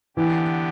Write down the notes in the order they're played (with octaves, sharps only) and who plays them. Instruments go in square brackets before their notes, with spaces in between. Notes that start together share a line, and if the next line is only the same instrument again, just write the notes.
[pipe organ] D3 B3 G4 [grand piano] E3